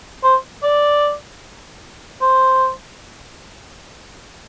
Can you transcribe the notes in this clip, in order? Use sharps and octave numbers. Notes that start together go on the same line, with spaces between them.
C5
D5
C5